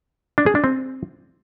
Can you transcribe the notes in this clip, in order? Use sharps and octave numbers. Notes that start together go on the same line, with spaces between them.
D4
G#4
D4
C4